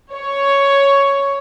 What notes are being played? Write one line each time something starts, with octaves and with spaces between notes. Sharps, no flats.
C#5